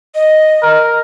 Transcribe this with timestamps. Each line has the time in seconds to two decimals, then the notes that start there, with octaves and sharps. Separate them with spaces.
0.15 D#5
0.63 A#4